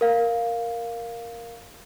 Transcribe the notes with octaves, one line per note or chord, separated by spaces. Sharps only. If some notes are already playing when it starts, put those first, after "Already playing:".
A#4 F5